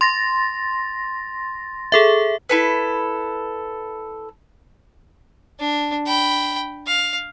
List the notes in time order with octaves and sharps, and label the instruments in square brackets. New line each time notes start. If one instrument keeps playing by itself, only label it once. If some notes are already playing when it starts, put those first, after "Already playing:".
[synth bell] C6 A6 A#6
G#4 A4 E5
[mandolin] E4 A4 B4
[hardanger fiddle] D4
G5 B5
F5